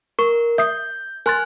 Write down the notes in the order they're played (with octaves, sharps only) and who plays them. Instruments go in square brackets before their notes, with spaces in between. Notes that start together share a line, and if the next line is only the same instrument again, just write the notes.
[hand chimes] A#4 [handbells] C#6
[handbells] E5 D#6 C7 [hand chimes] G6
[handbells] A#4 C6 A6 [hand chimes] G#5 F6 F#6